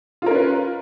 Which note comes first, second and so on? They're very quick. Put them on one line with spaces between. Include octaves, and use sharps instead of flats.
F4 A#4 C#4 B4